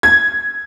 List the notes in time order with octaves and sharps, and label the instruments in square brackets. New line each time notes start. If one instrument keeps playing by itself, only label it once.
[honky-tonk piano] G#6